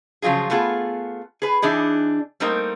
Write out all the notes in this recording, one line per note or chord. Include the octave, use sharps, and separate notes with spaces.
C#3 F3 F#3 F4 G#4
A3 B3 F4 G#4
G#4 B4
E3 D4 D#4 G#4
G3 A3 A#3 C4 D#4 A#4